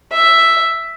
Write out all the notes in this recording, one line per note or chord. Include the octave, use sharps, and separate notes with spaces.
E5